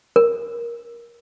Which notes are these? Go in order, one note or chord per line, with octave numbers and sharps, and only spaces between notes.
A#4